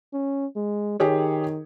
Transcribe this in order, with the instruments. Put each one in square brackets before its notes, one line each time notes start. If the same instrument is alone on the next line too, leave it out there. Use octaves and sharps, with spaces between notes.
[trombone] C#4
G#3
[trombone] D#3 [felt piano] G4 G#4 C#5